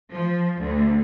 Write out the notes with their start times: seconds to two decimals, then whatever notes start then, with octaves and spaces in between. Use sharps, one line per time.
0.12 F3
0.60 D2